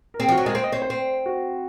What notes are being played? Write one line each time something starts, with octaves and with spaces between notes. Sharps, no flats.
A#4
C4 G#4
F3 F#4
F#3
G#3 A#4
C4 C5
D#5
C4 C#5
C5
C4
F#4